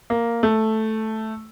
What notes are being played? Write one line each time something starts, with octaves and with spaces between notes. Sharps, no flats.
A#3
A3